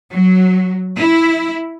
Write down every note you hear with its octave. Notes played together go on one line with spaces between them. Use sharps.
F#3
E4